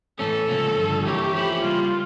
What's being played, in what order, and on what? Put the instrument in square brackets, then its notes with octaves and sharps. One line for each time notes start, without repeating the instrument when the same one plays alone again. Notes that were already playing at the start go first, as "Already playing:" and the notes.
[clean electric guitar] A2 E3 A3 C#4 [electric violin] A4
[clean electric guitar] C#2 C#3 F3 A#3 C#4
G2 D3 F3
[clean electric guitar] E3 A#3 E4 A#4 C#5 [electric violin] G4
[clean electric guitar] F3 A3 C#4 E4
[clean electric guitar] C#3 G3 A#3 [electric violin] F4